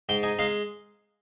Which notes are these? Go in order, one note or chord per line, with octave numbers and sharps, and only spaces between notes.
G#2 G5
D#4 G#5
G#3 F5